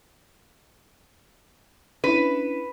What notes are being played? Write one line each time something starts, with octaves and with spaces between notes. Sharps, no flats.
C#4 D4 E4 B4